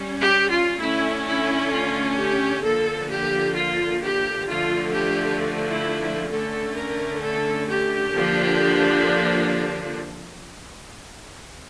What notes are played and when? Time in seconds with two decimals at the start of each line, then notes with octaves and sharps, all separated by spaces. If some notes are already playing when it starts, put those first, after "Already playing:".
Already playing: G3 C#4
0.20 G4
0.50 F4
0.81 D3 A3 C#4 E4
1.27 E4
1.72 F4
2.18 G4
2.64 D3 F3 A#3 A4
3.10 G4
3.56 F4
4.02 G4
4.47 D3 F3 A3 F4
4.93 G4
5.69 E4
6.01 E4
6.30 D3 A3 C#4 A4
6.77 A#4
7.22 A4
7.68 G4
8.13 D3 F3 A#3 D4